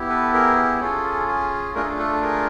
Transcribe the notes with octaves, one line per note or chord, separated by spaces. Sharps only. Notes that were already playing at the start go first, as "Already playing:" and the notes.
Already playing: B3 E4 G4
A4 B4
G#4 A#4
G#4
C#4 F4 G#4 A4
G#4
A3 D4 F4 G#4 A#4
A4
G#4
A4
G#4 A#4